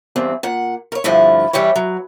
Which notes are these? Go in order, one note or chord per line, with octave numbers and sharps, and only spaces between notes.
E2 G2 C4
A#2 F#5
A#4 C#5
G2 D3 F3 A3 E4
E3 G3 E4 G4 C#5
F#3